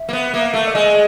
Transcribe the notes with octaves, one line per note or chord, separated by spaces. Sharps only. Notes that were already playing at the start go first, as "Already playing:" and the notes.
Already playing: E5
A#3
B3
A#3
A3
D5
G#3 D#5